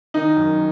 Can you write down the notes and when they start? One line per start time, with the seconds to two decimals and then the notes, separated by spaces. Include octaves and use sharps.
0.14 D#3 D#4
0.36 F#2